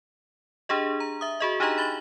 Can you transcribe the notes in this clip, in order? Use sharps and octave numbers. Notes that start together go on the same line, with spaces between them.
D4 G4 G#4 D#5
A#5
E5 D#6
F#4 G#4 D#5
D4 D#4 G4 G#4 D#5 A#5
B5 A6 F#7 G7